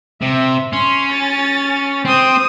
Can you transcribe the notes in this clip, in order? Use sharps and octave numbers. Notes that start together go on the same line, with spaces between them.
C3 E5
C#4 C6
A6
C4 C5 D#6